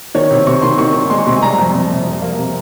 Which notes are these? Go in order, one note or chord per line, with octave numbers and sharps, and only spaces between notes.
D#3 C#5
C3
C3 C#6
D#3 C6
D#3 C#6
D#3
G#3 C6
C#6
C3 C6
G#5
G3 A#5
F2
C3
C3
F2
A#3
C3